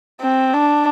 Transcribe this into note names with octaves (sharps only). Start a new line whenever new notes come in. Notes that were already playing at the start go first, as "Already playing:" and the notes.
C4
D4